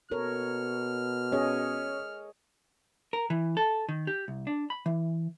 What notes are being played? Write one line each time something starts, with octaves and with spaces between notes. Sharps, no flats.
B2 A4 A#4 C#5 F6
C#4 G#4 C#5 D#5
A#4
E3
A4
D#3
G4
C2
D4
B5
E3